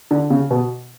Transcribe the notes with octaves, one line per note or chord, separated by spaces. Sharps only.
D3
C#3
B2